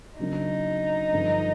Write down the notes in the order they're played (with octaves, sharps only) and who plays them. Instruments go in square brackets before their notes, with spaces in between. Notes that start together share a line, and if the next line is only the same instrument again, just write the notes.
[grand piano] C#3 F#3 A#3 D4 [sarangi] D#4
[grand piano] G2 D3 F3